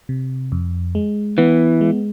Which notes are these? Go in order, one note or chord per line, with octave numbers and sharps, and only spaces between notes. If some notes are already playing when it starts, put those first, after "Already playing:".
C3
F2
G#3
E3 B3
G#3